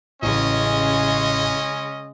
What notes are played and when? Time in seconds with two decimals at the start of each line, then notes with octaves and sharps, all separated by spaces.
0.22 A1 C#3 G#3 C#4 D#5